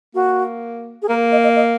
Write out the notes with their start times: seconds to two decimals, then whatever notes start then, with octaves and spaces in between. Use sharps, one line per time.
0.15 A#3 F#4
1.02 G#4
1.08 A#3 A#4
1.32 D#5
1.44 D#5
1.56 D#5